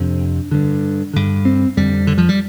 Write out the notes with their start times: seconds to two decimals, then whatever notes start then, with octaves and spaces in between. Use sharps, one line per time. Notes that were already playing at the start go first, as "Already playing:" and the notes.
Already playing: F2 C3 D4
0.51 G2 D3
1.14 G2 D3
1.45 C4
1.77 F2 D3 G3
2.07 D3
2.18 F3
2.29 G3